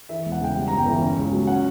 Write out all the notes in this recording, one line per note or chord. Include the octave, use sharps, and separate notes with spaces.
E3 E5
E1
F#5
C#3 G5
G3
A#5
G1
G5
E3
C#4
C#2
F#3
C#4 F#5